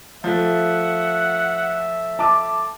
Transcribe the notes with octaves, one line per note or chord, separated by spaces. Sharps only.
F3 A3 E5 F#5
A5 D6